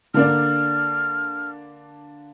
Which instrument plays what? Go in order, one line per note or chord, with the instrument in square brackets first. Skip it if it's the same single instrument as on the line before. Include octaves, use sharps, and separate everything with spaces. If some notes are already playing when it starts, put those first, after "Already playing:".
[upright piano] D3 A#3 D4 [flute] F6